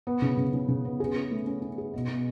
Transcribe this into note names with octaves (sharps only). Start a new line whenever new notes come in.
B3
C#3
C#3
C#3
C#3
B3
G#4
C#4
A3
C#4
C#4
G#4
B2
B2